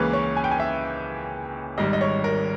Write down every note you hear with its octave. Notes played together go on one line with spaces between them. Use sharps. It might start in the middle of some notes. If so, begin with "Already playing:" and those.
Already playing: C#2 C#3 E3 A#3 C#4 B4
C#5
G#5
G5
G#5
E5
G#1 G#2 G3 D#5
D#5
C#5
A#4